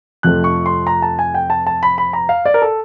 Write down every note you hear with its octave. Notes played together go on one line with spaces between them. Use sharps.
F2 C3 F3 A3 F#6
C#6
C6
A#5
A5
G#5
G5
A5
A5
B5
B5
A#5
F5
D5
A#4
A4